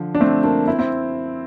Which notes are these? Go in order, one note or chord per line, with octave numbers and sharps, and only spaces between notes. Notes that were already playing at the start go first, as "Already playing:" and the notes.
Already playing: D3 F3
D4
A3 C4
A#3 D4
C4 E4
C4 E4